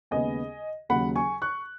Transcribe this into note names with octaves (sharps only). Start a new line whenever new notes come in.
D#2 C#3 G#3 B3 D#5 G#5
D#2 C#3 F#3 F#5 B5
G#5 C#6
C#6 F#6